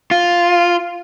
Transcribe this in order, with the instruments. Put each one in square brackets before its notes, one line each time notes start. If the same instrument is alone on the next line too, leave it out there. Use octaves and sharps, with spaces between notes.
[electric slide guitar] F4